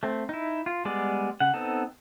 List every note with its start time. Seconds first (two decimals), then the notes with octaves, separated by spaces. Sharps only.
0.03 A3 C4
0.29 D#4 E4
0.66 F4
0.85 G3 G#3 B3 G#4 D5
1.40 C#3 F#5
1.54 B3 C4 D#4 A4